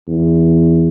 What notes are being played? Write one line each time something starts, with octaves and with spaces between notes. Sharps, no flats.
E2